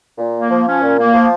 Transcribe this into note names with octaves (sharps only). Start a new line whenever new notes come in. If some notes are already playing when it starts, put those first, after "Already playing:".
A#2
A#3
F3
C#4
A#2
A#3
F3